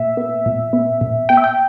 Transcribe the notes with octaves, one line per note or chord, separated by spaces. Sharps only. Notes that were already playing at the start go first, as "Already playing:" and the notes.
Already playing: A#2 E5
B3
A#2
B3
A#2
B3 G5
E5
G5